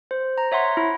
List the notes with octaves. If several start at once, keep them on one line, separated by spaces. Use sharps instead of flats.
C5
A#5
C#5 E5 F#5 C6
E4